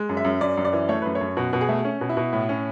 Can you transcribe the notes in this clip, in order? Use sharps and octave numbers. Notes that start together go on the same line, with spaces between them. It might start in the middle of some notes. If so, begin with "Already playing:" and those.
Already playing: G#3
F#2
E5
F#2
F#2 D5
F#2
D5
E3
A3 C#5
F#2 B4
C#5
F#2
B2 F#4
B2
G#4
A3
C#4
B2
E4
B2
A2
C#4